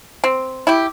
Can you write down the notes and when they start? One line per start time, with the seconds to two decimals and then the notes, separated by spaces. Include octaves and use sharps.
0.24 C4
0.67 E4 G4